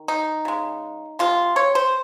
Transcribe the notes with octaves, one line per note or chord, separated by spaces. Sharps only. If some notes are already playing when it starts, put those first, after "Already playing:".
Already playing: D#3
D#4
C#3 G#3
C3 F3 G#3 F4
C#5
C5